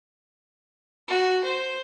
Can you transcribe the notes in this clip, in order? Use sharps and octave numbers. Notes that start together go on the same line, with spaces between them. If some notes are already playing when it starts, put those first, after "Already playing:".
F#4
C5